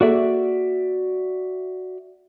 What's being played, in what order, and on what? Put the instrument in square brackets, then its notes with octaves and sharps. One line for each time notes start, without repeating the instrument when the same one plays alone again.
[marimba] A#3 G#4 A4 [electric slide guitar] F#4 D5 E5